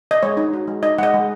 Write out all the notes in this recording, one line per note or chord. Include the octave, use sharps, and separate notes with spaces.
D#5
G#3 C#5
D#4
F#4
G#3
D#4 D#5
G#3 D#5 F#5
G#3